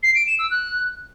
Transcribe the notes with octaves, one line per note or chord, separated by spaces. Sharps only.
C7
D7
E7
E6
F#6